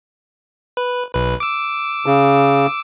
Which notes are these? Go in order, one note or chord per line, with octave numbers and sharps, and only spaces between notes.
B4
B1 B4
D6 E6
C#3